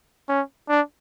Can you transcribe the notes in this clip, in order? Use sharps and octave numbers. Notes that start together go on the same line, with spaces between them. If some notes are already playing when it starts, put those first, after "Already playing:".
C#4
D4